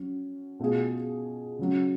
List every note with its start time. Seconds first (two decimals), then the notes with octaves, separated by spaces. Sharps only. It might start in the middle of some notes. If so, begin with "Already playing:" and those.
Already playing: F#3 C#4
0.60 B2 A3 F4 G#4
1.59 C#3 F#3 C#4